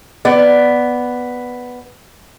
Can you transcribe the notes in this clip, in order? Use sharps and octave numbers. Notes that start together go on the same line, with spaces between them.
B3 D5